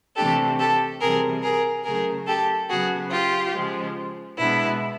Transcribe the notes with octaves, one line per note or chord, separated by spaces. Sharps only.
C3 E3 A3 D4 G4 A4
G4 A4
C3 E3 G3 G#4 A#4
G#4 A#4
C#3 F#3 A3 G#4 A#4
G4 A4
C#3 F#3 B3 F#4 G#4
F4 G4
C#3 F3 G#3
B2 G#3 B3 D4 E4